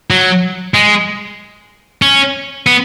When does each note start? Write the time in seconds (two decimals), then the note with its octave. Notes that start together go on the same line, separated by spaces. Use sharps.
0.10 F#3
0.74 G#3
2.02 C#4
2.67 B3